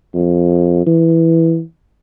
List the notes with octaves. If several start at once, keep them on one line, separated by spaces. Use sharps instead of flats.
F2
E3